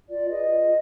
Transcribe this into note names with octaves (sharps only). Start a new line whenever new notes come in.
F4 D5
G#4 B4 D#5
F4